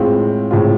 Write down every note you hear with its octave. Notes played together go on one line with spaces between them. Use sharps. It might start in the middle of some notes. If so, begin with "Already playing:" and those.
Already playing: A2 G#3 C4 F4
A2 G#3 C4 F4